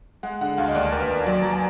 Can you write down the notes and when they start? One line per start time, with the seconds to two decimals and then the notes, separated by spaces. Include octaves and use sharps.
0.23 G#3 F#5
0.41 D3 F#5
0.58 D2 F5
0.68 D#5
0.75 D#2 D5
0.92 D#2 A#4
1.00 B4
1.10 D#2
1.26 F#3 D5
1.42 F#3 A#5
1.53 G#5